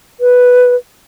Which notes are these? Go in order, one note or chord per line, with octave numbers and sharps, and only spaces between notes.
B4